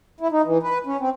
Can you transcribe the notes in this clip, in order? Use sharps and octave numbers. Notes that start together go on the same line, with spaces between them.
E4
D#4
E3
B4
C#4
C4